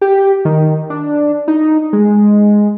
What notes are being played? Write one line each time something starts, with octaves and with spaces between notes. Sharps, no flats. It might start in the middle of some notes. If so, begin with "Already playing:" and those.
G4
D#3
D4
D#4
G#3